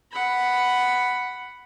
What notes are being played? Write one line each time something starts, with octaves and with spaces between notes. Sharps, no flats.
F#5 B5